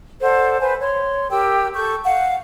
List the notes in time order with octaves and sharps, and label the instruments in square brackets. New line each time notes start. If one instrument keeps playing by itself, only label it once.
[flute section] A4 C5 D5 F#5
B4 C5 G#5
C#5 C6
G4 A#4 G5 E6
A4 C#6 G6
F5 F#5